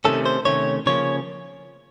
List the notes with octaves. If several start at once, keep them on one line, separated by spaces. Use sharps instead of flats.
C3 D#3 A3 C#4 A4
C5
C3 D#3 A3 C#4 C#5
C#3 F3 A#3 C#4 C#5